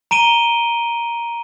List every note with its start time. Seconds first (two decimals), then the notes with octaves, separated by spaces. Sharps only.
0.11 A#5 D7 D#7 G7